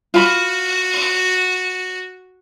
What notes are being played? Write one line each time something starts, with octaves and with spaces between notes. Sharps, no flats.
F4 F#4 B5